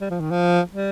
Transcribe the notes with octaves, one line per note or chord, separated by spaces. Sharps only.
G3
F3
D#3
F3
G3